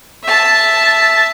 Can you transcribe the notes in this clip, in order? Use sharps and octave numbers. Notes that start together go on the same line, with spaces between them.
E5 A5